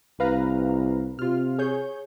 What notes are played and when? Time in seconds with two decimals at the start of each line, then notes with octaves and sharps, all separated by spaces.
0.20 C2 B4 F5 A#5
1.19 C3 F4 F6
1.58 G#4 C#5 G6